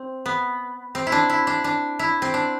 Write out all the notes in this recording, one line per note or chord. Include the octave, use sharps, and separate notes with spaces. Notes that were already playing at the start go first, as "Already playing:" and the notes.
Already playing: C4
B3
C4
E4
D4
E4
D4
D4
E4
C4
D4